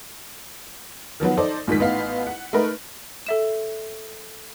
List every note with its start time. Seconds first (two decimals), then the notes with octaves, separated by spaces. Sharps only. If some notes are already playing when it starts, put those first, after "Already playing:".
1.20 D#3 F3 F#3 B3
1.37 D#4 A4 C5 D5
1.67 A#1 G#2 D#3 B6
1.79 A1 B3 D#4 F5
2.27 F#5
2.53 A3 D#4 A#4 B4
3.26 A4 E5 E7